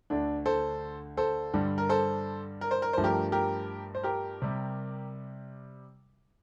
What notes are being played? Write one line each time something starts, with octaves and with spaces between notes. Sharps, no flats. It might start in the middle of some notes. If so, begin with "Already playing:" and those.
D2 D3 A3 D4
A4 C5
A4 C5
G2 D3 G3
A#4
A4 C5
A#4
C5
A#4
G2 F3 A3 C5
G4 A#4
G4 A#4
C5
G4 A#4
C3 G3